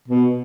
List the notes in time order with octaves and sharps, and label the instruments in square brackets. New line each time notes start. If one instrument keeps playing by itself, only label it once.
[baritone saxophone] B2